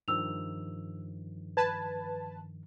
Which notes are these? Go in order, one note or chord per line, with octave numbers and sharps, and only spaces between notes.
G2 D#3 F3 E6 F7
B4 A5 G#6